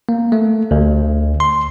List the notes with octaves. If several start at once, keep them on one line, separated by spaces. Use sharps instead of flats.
A#3
A3
D2
C6